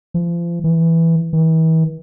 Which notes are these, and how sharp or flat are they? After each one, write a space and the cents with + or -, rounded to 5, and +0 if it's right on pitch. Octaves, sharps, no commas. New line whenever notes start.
F3 -35
E3 +0
E3 -40